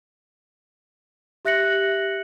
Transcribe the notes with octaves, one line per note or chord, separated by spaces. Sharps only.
G4 E5 F#6 A#6 C#7 F#7